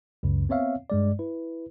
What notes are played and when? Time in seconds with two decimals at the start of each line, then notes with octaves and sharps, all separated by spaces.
0.23 C#2 F#2 C#3
0.49 B3 C4 C#5 E5 F5
0.90 G2 G#3 D5
1.19 E4 B4